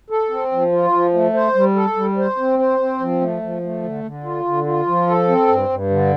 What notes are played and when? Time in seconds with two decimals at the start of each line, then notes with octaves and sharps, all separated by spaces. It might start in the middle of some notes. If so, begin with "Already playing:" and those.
0.10 A4
0.30 C4
0.52 F3
0.72 F4
0.93 F3
1.14 A3
1.34 C5
1.55 G3
1.76 A4
1.96 G3
2.17 C5
2.38 C4
2.59 C5
2.79 C4
3.00 F3
3.21 A3
3.42 F3
3.62 A3
3.83 D3
4.04 D3
4.24 F4
4.45 D3
4.66 F4
4.86 F3
5.07 A4
5.28 C4
5.48 G2
5.69 G2
5.90 D3